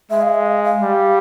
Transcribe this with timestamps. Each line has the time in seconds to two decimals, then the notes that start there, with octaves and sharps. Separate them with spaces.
0.10 G#3 E5
0.22 F5
0.34 E5
0.46 F5
0.64 F5
0.82 G3